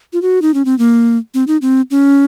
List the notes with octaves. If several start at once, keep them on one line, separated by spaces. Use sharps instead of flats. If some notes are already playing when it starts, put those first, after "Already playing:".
F4
F#4
D#4
C#4
C4
A#3
C4
D#4
C4
C#4